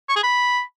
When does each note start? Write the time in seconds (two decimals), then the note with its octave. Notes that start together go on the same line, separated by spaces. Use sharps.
0.09 C#6
0.16 G#4
0.23 B5